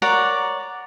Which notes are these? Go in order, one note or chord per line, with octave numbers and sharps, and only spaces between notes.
A#4 C#5 D5 F#5